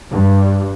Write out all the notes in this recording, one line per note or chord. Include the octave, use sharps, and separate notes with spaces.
G2